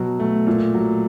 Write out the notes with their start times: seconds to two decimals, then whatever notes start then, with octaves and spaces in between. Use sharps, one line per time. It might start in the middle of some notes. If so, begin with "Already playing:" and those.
Already playing: B2 F#3
0.20 A3
0.47 A#2
0.74 F#3